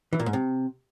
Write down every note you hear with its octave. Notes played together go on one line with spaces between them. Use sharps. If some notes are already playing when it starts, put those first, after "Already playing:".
E3
A#2
G#2
C3